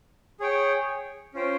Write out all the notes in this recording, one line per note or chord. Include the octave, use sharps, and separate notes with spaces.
G#4 C#5 G5
C#4 F4 C5 G5